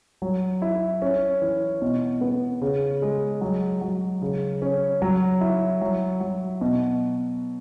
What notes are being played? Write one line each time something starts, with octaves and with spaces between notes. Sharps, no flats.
F#3
E4
C#4
E3
B2
B3
C#3
G#3
F#3
F#3
C#3
C#4
F#3
E4
F#3
F#3
B2